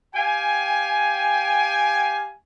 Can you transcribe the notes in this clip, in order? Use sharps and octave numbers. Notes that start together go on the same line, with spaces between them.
G4 F5 G5 G#5